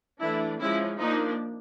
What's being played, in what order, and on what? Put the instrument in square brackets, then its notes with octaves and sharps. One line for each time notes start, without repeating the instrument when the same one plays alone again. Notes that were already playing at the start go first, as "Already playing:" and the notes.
[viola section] E3 A3 D4 E4
F3 G#3 C#4 E4
F3 A#3 D4 D#4